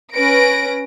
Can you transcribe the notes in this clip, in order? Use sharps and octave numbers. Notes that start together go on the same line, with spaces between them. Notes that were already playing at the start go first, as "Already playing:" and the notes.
C#4 B4 A#6 D7